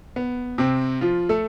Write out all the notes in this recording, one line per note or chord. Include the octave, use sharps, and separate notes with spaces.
B3
C3 C4
F3 F4
A3 A4